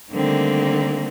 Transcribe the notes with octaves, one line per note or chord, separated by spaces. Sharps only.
D3 D#3 G3 A3 A#3 C4